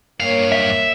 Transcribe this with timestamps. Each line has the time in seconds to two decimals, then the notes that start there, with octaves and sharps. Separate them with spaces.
0.20 G2 A#3 C#5 F5
0.52 E5